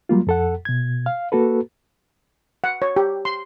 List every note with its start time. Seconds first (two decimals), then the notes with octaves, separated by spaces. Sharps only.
0.09 F#3 G3 A#3 F4
0.27 F2 A4 F#5
0.65 B2 G#6
1.06 F5
1.32 A#3 F#4 A4 B4
2.64 F#5
2.82 C#5
2.96 G4
3.25 C6